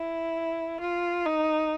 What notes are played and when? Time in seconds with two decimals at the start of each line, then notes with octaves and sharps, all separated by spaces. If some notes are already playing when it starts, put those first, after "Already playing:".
Already playing: E4
0.80 F4
1.26 D#4